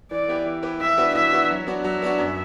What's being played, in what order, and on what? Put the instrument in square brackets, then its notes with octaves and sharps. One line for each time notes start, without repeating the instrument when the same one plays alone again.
[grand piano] E3 [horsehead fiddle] D5
[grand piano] B3 E4 G4 B4
E3
B3 E4 G4 B4
[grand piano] E3 [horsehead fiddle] E5
[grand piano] B3 D4 F#4 B4
[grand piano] E3 [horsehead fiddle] E5
[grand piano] B3 D4 F#4 B4
F#3
B3 D4 F#4
[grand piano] F#3 [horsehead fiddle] E5
[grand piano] B3 D4 F#4
F#2